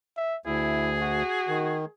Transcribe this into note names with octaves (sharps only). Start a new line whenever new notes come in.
E5
D2 E4 G#4
F#4
D#3